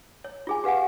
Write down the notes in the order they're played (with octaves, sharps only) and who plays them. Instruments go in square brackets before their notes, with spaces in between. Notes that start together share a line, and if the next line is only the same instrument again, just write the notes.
[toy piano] C#5
F4 G#4 G#5
G4 B4 F5 F#5 G#5